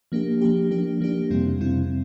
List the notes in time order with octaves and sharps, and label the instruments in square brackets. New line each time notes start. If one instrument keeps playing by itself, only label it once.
[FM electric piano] F3 A#3 D4 G4
F3 A#3 D4 G4
F3 A#3 D4 G4
F3 A#3 D4 G4
F2 C3 G3 C4 E4
F2 C3 G3 C4 E4